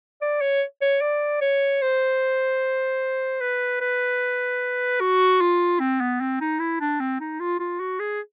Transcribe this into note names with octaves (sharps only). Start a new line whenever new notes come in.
D5
C#5
C#5
D5
C#5
C5
B4
B4
F#4
F4
C4
B3
C4
D#4
E4
D4
C4
D#4
F4
F4
F#4
G#4